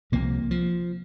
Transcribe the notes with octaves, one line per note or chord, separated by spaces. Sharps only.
C2 C3 F3 A#3
F3